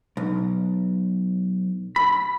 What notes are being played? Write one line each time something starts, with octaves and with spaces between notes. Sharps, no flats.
B1
B5